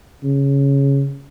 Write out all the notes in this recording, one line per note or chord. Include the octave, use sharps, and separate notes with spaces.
C#3